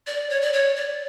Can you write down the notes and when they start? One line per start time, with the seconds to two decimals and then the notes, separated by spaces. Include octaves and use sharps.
0.07 D5
0.30 C#5
0.41 D5
0.53 C#5
0.76 D5